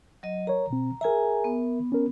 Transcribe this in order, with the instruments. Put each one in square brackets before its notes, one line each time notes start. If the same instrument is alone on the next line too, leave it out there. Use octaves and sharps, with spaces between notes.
[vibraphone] F#3 D#5
[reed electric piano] A#4 C#5 [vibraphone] A#5
[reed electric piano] B2 C4
[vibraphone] G#4 G#5 A#5 [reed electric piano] A#4 E5
[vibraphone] B3
[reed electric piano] C#4 A#4